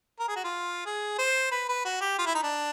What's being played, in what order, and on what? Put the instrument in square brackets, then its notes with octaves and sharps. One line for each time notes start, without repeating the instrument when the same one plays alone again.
[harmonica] A#4
G#4
F#4
F4
G#4
C5
B4
B4
F#4
G4
F4
E4
D#4
D4